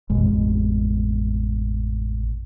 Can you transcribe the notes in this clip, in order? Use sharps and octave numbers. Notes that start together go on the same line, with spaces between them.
A1 F2 B2 G#3